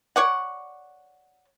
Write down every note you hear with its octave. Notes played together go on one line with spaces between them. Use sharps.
C#5 D5 F#5